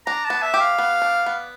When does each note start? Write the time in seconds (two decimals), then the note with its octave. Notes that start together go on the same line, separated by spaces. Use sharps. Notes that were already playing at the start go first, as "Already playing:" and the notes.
0.06 D4 A#5
0.25 A5
0.30 B3
0.42 E5
0.54 G4
0.61 F5
0.78 B3
1.02 D4
1.26 B3